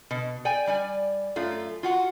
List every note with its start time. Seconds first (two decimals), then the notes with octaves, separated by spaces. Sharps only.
0.11 B2
0.45 D5 G5 G#5
0.67 G3 D5 G#5
1.36 F#2 A3 F4
1.83 F4 F#4 F#5